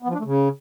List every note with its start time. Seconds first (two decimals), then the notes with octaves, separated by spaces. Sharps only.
0.03 B3
0.08 F3
0.14 D4
0.19 A3
0.25 C#3